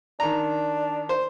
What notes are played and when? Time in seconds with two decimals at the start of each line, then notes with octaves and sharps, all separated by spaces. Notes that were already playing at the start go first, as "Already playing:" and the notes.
0.20 D#3 D4 A#5
1.09 C5